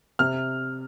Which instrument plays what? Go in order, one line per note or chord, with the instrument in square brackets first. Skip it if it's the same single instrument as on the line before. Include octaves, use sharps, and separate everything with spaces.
[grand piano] C3 F6